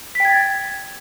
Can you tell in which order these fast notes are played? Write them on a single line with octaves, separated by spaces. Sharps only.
B6 G5 G#6 A6